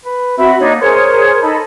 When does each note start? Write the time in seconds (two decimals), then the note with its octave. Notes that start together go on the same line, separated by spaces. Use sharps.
0.05 B4
0.38 C4 F#4 E5 B5
0.60 A#3 D4 D#4 C#5
0.81 G#4 A#4 C5 C#5
1.41 D#4 A4 B5